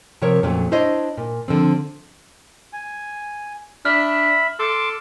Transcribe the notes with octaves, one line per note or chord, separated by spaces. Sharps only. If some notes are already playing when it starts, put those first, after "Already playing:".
C3 F3 A#4 C#5
F2 A#2 F#3 A3 C#4
D4 E4 C5 C#5 D#5
A#2
D3 F3 C4
G#5
D4 E5 B5 F6
A4 C6 D6